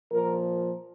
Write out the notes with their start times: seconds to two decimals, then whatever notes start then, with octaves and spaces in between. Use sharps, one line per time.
0.12 A#2 F3 A#4